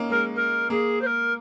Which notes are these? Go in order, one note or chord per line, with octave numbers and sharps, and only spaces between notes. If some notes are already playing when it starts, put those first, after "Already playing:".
Already playing: A#3 C#4 D#4
G#3 A#4
A#4
A#3 G#4
C5
A#4